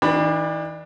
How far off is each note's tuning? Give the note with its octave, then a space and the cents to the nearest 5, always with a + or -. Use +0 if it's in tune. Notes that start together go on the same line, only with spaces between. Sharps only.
E3 -40 D4 +25 B5 +0